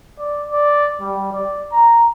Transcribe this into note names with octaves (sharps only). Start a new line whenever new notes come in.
D5
D5
G3
D5
A#5